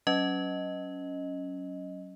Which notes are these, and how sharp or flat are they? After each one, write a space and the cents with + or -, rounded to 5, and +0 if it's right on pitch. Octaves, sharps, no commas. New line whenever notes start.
F#3 +20 C#4 +0 D#5 +0